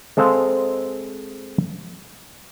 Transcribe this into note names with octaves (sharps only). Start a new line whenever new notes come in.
G#3 C4 A4 C5 F5